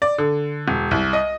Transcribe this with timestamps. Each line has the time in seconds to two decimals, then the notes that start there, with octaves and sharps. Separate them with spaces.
0.02 D5
0.18 D3
0.68 E1
0.91 C2
1.13 D#5